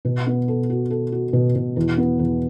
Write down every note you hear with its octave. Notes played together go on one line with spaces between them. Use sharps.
B2
B3
A4
F#4
A4
F#4
B2
B2
E2
B3
E2